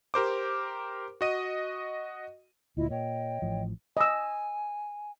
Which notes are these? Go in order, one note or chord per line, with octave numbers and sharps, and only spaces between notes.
G4 A#4 C5 D6
F#4 D#5 D#7
D2 A#2 E4 F4 D#5
A#2 C#5 D#5 G5
A1 A2 F3
D#5 G#5 E6